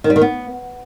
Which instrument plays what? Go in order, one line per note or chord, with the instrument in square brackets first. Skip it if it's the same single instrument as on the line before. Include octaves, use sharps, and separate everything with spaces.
[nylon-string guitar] D#3
G3
D#3
B3